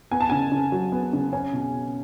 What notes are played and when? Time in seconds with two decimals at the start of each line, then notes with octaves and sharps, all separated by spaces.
0.11 B3 G#5
0.20 A5
0.30 C#3 G#5
0.52 C#3
0.72 F#3
0.92 B3
1.13 C#3
1.33 C#4 G#5
1.53 B2
1.73 B2